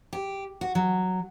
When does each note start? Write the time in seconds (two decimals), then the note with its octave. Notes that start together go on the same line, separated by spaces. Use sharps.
0.13 G4
0.61 F#4
0.75 F#3